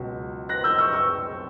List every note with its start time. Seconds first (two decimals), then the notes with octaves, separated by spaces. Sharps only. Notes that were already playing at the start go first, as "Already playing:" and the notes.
Already playing: C#2 B2 F#3
0.49 F#6 A#6
0.64 E6 G6
0.79 C#6 E6
0.93 C#6 E6